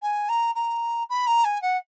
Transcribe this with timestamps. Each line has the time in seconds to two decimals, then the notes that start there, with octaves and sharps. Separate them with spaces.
0.02 G#5
0.29 A#5
0.55 A#5
1.10 B5
1.27 A#5
1.44 G#5
1.62 F#5